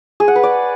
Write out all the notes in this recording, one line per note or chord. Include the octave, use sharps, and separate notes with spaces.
G#4
F#5
B4
D5